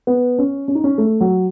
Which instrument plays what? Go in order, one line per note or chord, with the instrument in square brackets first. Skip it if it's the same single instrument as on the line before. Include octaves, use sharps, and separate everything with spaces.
[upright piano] B3
C#4
C#4
D#4
C#4
A3
F#3